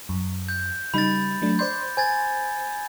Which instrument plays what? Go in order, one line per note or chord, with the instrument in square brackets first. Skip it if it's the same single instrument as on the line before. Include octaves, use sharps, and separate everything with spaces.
[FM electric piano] F#2
[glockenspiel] G6
[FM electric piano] C#3 G3 D#4 [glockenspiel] B5 A6
[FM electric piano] F#3 A3 D4
[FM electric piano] C5 D5 C6 [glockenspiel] G6
[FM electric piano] C5 [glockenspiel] G#5 G#6 A6